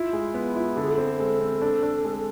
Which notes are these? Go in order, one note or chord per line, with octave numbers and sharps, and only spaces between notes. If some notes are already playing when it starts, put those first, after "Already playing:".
Already playing: E4 F4
G#3
B3
E4
D3 A4
G#4
A4
C4
G#3
C4
D4
D4
G#3